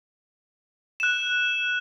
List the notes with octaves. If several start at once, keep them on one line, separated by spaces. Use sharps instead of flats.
F#6 E7